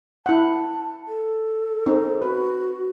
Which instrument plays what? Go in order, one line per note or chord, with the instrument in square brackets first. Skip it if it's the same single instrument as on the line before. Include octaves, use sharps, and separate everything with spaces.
[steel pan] E4 F#5 [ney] A5
[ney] A4
[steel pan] C4 D#4
[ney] F#4 [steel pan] B4